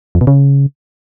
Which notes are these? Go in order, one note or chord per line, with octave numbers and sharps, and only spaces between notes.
F2
B2
C#3